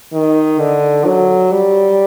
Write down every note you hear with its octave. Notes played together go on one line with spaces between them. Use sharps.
D#3
D3
F#3
G3